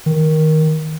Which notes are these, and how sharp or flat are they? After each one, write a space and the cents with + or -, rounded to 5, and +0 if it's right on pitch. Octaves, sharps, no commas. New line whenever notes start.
D#3 +10